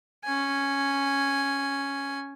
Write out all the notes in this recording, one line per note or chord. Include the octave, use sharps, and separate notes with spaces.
C#4 G#5